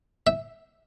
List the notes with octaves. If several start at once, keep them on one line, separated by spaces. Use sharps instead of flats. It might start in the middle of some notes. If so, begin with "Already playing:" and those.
E5